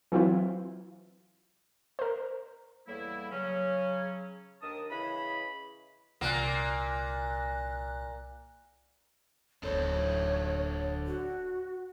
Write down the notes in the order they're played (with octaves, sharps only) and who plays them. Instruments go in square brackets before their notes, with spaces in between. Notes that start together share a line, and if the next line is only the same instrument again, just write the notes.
[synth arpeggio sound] E3 F#3 C4 E4 F4
A#4 C5
[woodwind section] E2 A2 G3 A#3 E4
C#3 F#3 C#4
D#2 D#3 D4 A#4 A5 D#6
C#3 E3 E4 D#5 B5
[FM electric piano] C2 F#6 [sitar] A#2 A#3
[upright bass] D1 B3 [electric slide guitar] D4 A4 C5 [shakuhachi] C#5
[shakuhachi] F#4